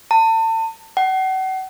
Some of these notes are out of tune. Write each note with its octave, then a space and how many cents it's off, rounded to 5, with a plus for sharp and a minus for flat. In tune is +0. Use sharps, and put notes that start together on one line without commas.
A5 +35
F#5 +40